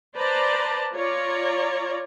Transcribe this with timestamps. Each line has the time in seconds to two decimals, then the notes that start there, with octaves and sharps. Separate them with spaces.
0.15 B4 C5 D5 A5 A#5
0.93 F4 C#5 D5 A#5